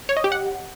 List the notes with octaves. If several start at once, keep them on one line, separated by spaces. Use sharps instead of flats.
C#5
D#5
G4
F#5